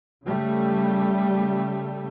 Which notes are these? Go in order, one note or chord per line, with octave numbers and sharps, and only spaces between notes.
C#3 G3 A3